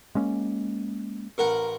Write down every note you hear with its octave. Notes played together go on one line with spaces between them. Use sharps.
G#3 A#3 C#4
A1 A#4 F#5